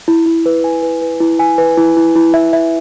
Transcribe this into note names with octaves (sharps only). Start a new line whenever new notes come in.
E4
E4
B4
G#5
B4
B4
E4
G#5
B4
E4
E4
E4
E5
E5